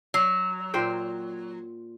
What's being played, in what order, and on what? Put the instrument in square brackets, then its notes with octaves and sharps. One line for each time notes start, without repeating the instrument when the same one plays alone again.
[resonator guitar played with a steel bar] F#3
[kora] A#2 C5 G5